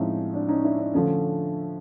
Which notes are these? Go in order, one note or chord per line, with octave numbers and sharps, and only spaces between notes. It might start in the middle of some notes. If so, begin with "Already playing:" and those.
Already playing: A2 F3 G#3 C4 C#4 D#4
D4
C#4 D#4
D4 E4
D4
D3 F3 A3 C#4